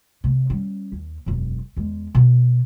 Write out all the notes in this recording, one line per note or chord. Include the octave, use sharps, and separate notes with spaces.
C3 A3
G3 C#4
D#2
E1 F#2
E2 G#3
B2